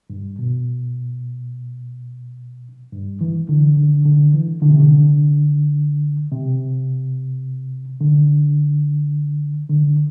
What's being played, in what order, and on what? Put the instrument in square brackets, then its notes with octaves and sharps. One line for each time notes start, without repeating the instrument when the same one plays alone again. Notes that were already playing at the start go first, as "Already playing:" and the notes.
[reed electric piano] G2
B2
G2
E3
D3
D3
D3
E3
D3
C3
D3
C3
D3
D3